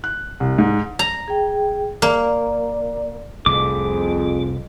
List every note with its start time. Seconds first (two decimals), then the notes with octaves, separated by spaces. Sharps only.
0.04 F#6
0.40 C2
0.58 G#2
0.99 A#5
1.28 G#4 G5
2.02 A#3 D5
3.46 F1 C2 F2 A2 G#4 D6